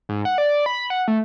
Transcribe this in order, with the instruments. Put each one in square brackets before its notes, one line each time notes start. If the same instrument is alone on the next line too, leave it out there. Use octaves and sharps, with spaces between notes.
[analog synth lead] G#2
F#5
D5
B5
F#5
A3